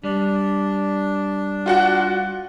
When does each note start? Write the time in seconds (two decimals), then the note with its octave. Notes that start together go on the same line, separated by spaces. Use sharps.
0.04 G3 D4
1.66 F4 F#4 F#5